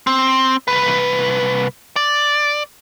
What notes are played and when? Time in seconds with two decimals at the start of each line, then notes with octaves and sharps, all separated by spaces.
0.07 C4
0.68 C2 B4
1.96 D5